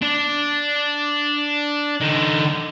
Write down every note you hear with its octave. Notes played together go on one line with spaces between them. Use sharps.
D4
D3 D#4